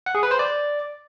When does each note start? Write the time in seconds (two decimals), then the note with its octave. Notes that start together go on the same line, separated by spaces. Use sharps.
0.06 F#5
0.15 G#4
0.23 B4
0.31 C5
0.39 D5